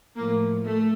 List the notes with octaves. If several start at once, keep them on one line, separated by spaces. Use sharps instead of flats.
A2 F3 A#3
A3